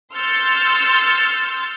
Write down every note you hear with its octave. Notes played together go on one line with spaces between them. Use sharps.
C6 E6 F6 G6 A6 C#7